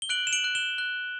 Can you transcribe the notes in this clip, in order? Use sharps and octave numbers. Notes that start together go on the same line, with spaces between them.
G7
F#6 D7 F#7
E7
D7 F#7
F#6
E7 G7
F#6